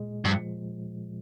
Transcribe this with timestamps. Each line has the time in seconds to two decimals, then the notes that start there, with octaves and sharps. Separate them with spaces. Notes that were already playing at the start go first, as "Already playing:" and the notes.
Already playing: A#2 G#3
0.25 G2 F3